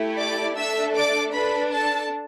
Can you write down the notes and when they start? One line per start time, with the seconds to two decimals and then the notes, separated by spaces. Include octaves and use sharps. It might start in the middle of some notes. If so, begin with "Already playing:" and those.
Already playing: A3 E4 G4
0.17 D5 D6
0.55 A3 D4 A4 E5 E6
0.95 D5 D6
1.33 D4 A4 B4 B5
1.71 A4 A5